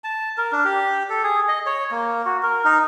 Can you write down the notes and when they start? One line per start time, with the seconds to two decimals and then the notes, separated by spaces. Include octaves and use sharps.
0.04 A5
0.38 A#4
0.52 D4
0.65 G4
1.10 A4
1.23 G#4
1.48 D#5
1.66 C#5
1.91 A#3
2.25 F#4
2.43 A#4
2.65 D#4